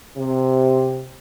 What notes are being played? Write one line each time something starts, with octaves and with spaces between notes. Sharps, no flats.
C3